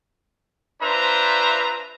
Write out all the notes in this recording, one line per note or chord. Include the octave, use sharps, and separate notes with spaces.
D4 F4 B4 C5 E5 A#5